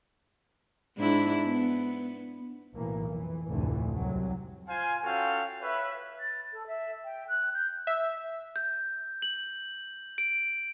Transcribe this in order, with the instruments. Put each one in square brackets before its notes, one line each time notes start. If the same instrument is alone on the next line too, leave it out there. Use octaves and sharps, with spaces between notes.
[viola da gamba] G#2 D4 E4
B3
[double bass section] B1 A2 E3 A#3
F2 E3
F1 D2 A2 D3 E3
C2 C3 F#3
[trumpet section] F4 C5 F5 G#5
C#4 F4 F#4 A4 F5 G5
B4 C#5 E5
[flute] A6
A4
E5
G5
F#6
G6
[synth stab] E5
[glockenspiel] G6
F#7
D7